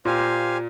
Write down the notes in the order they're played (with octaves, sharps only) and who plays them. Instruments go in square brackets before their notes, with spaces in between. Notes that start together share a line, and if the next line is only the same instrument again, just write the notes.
[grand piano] A#2 [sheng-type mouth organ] G4 C5 F5 G#5